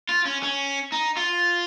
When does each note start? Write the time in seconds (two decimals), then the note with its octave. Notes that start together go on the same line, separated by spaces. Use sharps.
0.09 F4
0.25 C#4
0.43 C#4
0.92 D#4
1.17 F4